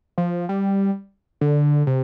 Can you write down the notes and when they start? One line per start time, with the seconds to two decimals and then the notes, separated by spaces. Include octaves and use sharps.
0.18 F3
0.49 G3
1.41 D3
1.87 C3